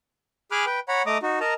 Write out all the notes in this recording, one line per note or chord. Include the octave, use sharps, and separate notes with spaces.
G#4 G#5 B5 D6 F6 F#6
B4 G5
C#5 F#5 A#5 B5
A3 D#5 A#5 D6 D#6
D#4 F#4
A#4 D#5 A5 A#5